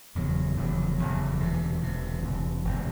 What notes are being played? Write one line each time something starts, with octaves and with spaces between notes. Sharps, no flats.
F1 E2 C#3 F#3
F1 E2 C#3 F#3
F1 E2 C#3 F#3
E1 D2 C3 E3
E1 D2 C3 E3
E1 D2 C3 E3
E1 D2 C3 E3